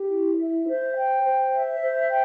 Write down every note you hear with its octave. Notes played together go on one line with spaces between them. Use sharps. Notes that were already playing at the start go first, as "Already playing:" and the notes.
Already playing: G4
E4
E5
C5
G5
C5
E5
C5
G5